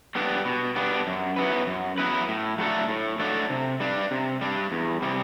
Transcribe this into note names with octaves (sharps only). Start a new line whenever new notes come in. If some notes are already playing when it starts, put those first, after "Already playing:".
G3 B3 D4 G4
B2
G3 B3 D4 G4
F#2
F#3 B3 E4 B4
F#2
F#3 B3 E4 B4
A2
F#3 A3 D4 A4
A2
F#3 A3 D4 A4
C3
G3 D4
C3
G3 D4
E2
C3 G3